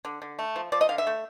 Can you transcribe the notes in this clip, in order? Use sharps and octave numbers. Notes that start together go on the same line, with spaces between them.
D3
D3
A3
F3
F3 D5
D#5
D3 F5
E5
A3